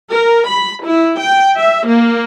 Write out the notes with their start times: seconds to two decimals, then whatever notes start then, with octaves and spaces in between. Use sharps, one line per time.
0.11 A#4
0.48 B5
0.83 E4
1.20 G5
1.56 E5
1.87 A#3